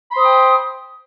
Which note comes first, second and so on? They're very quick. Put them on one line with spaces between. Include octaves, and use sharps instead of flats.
B5 C6 C5 D#6 G5